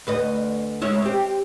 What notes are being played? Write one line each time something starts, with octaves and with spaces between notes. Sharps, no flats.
D2 B4 D#5
G#3 C#4 E4
C4 G4